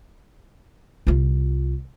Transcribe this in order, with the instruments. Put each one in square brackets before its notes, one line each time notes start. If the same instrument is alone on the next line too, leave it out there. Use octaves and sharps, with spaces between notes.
[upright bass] C2 F4